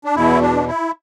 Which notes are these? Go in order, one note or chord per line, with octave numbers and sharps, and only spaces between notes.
D4
E2 B2 E4
D4
E4